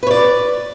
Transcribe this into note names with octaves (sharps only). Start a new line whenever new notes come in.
B4 C#5 D5